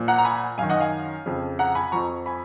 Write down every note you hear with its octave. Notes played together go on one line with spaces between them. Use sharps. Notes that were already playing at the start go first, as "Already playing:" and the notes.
Already playing: A#2 F3
F#5 A#5
A#5
G#5 B5
F#2 D#3 F5 G#5
D#5 F#5
F5 G#5
F2 C#3 F3
F#5 A#5
G#5 B5
F2 F3 A#5 C#6
G#5 B5